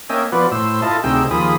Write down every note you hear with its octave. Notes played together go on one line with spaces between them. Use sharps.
A#3 C#4 D#5 E5 G5 G#5
F3 B3 F#4 B4 D5
A2 C5 E6
E4 F4 A4 D#5 A5
D2 C3 D#4 G#4 G5 E6
D#2 F3 G#4 B5 D#6